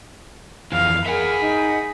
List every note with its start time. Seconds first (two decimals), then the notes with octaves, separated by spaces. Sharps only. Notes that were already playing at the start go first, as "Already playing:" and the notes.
0.72 F2 E3 F5
1.06 G#4 A#4 E5 F#5 G#5 B5
1.41 D#4